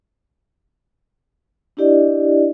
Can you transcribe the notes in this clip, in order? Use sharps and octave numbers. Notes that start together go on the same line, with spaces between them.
D4 E4 G4 D5 D#5